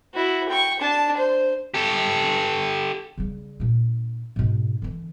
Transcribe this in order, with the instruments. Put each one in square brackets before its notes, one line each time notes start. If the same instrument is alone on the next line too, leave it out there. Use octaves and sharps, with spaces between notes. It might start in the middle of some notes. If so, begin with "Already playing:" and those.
[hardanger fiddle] E4 F#4
G5 C#6
D4 A5
C5
[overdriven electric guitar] G4 A4
[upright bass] C#3 G3
A#2 D4
G#2 B2
D3 E3